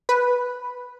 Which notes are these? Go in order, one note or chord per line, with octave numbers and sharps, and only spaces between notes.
B4